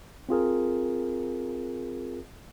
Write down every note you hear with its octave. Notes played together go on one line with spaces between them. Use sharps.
C4 F4 G#4 A#4